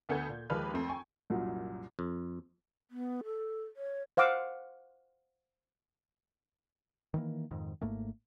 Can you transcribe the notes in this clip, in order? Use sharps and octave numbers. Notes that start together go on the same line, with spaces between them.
D2 B3 A4 F#5 G6 G#6
A#2
D#2 F3 G#3 A#3 B4 F6
F2 A3 C4
G5 G#5 C#6
C2 F#2 A#2
F2
B3
A4
C#5
C5 F5 F#5 D6 E6
D#3 E3 A#3
F2 G#2 D#3
G#1 G#2 A3 A#3